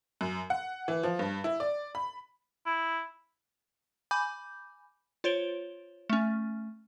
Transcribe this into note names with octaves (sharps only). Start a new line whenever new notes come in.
F#2
F#5
E3
F3
G2
E4
D5
B5
E4
G#5 B5 D6 G6
F4 C5 C#5 D7 G7
A3 C#4